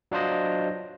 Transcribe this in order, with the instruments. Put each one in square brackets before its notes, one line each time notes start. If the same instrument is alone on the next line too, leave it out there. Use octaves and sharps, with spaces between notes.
[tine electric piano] F#3 D4 F4 C5 D#5